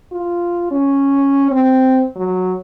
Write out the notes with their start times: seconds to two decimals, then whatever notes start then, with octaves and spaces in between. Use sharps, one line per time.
0.12 F4
0.71 C#4
1.51 C4
2.16 F#3